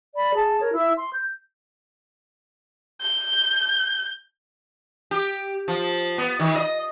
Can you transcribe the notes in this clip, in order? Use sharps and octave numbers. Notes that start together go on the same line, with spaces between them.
D5 B5
G#4 A5
A#4 C#5
E4 E5 E6
C6
G6
G6
G4
F3
B3
D#3
D#5